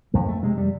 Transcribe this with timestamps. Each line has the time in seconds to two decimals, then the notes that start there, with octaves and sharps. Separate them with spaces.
0.14 F2 A3
0.28 A3
0.43 C3 G#3
0.58 G3